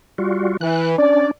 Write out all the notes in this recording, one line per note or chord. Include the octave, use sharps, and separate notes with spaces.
G3 F4 F#4
E3 F#6
C#4 D4 D5